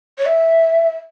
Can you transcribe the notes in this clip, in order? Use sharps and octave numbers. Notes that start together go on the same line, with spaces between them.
C#5
E5